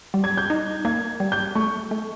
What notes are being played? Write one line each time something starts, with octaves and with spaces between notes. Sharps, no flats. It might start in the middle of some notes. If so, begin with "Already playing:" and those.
G3
G#6
G6
D#4
A#3 G#6
G3
G6
A3 C#6
A3